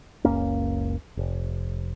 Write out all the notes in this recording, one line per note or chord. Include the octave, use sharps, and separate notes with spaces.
F#1 C#2 A#3 C#4
F1